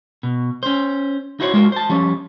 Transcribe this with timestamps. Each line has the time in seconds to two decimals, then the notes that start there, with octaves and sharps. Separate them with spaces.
0.23 B2
0.63 C#4 C5
1.40 D#4 E4 F#4 C5 C#5
1.54 G#3 F4 F#4 A#4
1.72 C5 A5
1.89 F3 G3 C#4